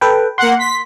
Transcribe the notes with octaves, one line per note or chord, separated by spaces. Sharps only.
A4 B4 G5
A#3 F#5 C6
B6